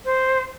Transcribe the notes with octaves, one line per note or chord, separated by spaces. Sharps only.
C5